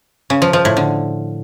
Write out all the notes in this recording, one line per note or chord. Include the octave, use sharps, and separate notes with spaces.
C#3
F3
F3
A2
D3